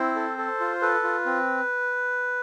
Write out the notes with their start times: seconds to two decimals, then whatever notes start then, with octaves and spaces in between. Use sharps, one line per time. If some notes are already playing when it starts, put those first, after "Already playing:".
Already playing: C4 E4 C5
0.16 A4
0.38 A4
0.60 F4
0.82 A4 B4
1.04 F4
1.26 C4